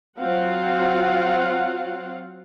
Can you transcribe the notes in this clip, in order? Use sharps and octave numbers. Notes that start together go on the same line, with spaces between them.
F#3 C4 F4 F5 F#5